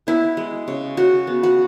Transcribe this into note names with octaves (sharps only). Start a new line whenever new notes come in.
B3 E4
G#3
C#3
C#3 F#4
B3
F#4